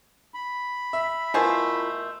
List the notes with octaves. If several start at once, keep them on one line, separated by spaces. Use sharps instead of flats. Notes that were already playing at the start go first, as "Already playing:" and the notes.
B5
E5
B2 A3 E4 F4 G#4 A#4 C5